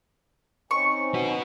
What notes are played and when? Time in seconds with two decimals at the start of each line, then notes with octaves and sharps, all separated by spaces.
0.71 C4 C#4 D#4 C#6
1.14 F#4 B4